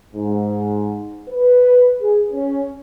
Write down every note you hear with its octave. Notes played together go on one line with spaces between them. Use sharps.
G#2
B4
G#4
C#4